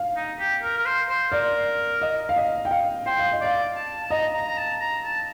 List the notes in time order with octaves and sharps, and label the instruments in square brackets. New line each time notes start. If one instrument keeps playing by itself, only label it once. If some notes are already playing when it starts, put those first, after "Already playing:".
Already playing: [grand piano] F5
[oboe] D#4
G4
A#4
A#4
C5
C5
[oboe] A#4 [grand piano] D5
[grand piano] D#5
F5
D#5
G5
F5
[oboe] C5 [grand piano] G5
[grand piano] F5
D#5
[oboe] D5 [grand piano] F5
[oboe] A5
A5
[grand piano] D#5 [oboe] A#5
[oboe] A#5
A#5
A5
A#5
A5